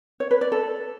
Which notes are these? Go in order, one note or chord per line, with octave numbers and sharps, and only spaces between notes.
C#5
B4
D5
A4